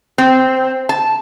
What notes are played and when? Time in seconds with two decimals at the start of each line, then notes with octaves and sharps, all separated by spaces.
0.18 C4
0.89 A5